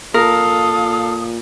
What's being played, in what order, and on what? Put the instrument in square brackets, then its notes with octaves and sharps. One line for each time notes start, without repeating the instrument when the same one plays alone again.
[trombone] A#2 [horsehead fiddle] A4 F5 [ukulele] A#4 [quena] D#6